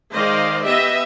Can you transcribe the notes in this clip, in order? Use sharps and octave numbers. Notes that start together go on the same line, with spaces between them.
D#3 G#3 C5 D5 D#5 F5
B3 G4 D#5 E5